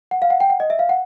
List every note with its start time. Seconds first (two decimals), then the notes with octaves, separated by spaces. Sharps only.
0.11 F#5
0.22 F5
0.30 F#5
0.40 G5
0.50 F#5
0.60 D#5
0.70 E5
0.79 F5
0.89 F#5